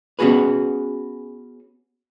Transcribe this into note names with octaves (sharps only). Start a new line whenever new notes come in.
B3 C#4 F#4 G#4 B4